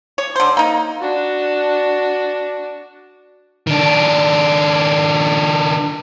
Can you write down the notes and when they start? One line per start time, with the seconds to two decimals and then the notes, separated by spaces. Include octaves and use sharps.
0.18 C#5
0.36 D3 C5
0.57 A#3 D#4
1.00 D4 F#4
3.67 D#3 D4